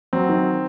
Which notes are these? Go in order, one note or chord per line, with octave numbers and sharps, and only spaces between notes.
F#3 C4
D#3